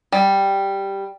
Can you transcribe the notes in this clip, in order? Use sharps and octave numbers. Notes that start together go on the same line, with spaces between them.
G3